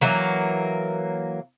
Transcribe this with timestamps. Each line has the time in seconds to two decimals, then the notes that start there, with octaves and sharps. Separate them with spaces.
0.01 E3 F#3 A#3